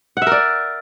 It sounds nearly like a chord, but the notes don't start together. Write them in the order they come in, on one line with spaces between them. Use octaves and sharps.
F#5 E5 A#4 D5